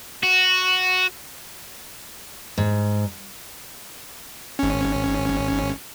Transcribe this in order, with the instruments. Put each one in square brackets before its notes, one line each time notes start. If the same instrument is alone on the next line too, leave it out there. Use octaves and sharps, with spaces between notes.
[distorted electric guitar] F#4
[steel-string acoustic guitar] G#2
[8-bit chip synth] G#1 C#4